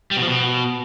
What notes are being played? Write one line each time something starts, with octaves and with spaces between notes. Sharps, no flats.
G3
B2
F3
B2